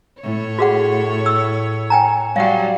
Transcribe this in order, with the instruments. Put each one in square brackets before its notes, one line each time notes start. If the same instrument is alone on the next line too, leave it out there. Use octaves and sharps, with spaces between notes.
[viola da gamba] A2 C#5
[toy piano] F#4 G#4 F#5
E6
G5 G#5 A#5
[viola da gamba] F#3 G3 [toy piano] F5 F#5